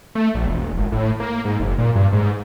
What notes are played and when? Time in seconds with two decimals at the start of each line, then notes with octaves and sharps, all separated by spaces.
0.15 A3
0.35 A#1
0.46 E1
0.77 G#1
0.92 A2
1.20 A#3
1.45 G#2
1.60 F#1
1.78 A#2
1.95 G2
2.12 G#2